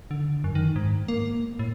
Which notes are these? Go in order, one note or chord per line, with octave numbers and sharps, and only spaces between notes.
D3
F#2
D#3
G#2
A#3
A2